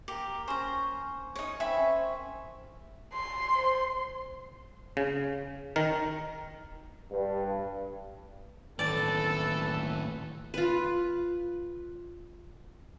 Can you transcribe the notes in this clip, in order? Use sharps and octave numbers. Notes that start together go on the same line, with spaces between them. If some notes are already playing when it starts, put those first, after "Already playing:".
A#3 G4 A#5
C#4 C5 A#5
D#4 C#5
C4 E5 G#5 B5
C#4 C5
C6
C5
C#3
D#3 A#4
G2
D#2 A2 E3 A3 A4 B4 D5
F4 B4